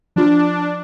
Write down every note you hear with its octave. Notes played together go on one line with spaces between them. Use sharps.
F3 D4 F4